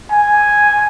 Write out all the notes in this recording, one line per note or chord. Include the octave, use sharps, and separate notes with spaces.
G#5